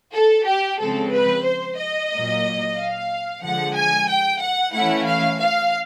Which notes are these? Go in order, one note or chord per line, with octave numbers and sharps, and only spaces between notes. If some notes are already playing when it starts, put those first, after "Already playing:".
A4
G4
C#3 F3 G#3 C4 A4
B4
C5
D#5
A#2 F#3 A#3
F5
D3 F3 G#3 F#5
G#5
G5
F#5
E3 A3 C#4 E4 F#5
F5
F5